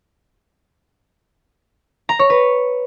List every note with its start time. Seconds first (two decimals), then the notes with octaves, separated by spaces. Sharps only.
2.09 A#5
2.19 C#5
2.30 B4